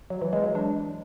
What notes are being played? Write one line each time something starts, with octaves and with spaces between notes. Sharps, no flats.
F#3
E3
G#3
F#3
D4